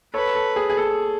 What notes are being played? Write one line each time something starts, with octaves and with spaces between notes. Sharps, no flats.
A4 B4 C#5
A4
G#4
G#4
A4